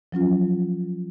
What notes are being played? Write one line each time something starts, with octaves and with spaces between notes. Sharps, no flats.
F3 F#3 C#4 F4